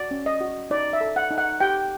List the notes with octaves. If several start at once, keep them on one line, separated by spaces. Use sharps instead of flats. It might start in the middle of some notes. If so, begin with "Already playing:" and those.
Already playing: F#4 D5
C#4
D#5
F#4
D#4 D5
E5
A4
F#5
D#4
F#5
G4 G5